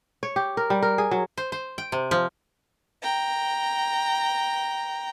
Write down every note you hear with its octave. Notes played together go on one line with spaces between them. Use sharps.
C#5
G4
A#4
G3
A#4
G#4
F#3
C5
C5
G5
C3
F3
G5 A#5